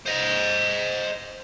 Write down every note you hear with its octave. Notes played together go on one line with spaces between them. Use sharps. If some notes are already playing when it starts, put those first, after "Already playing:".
C5 D#5